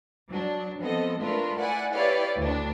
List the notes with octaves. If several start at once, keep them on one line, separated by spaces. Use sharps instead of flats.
F#3 D4
F3 B3 C4 A4 D#5
A3 D4 F4 A#4 B4
E4 D5 F#5 G#5
E4 G4 B4 C#5 D5 F5
D2 D4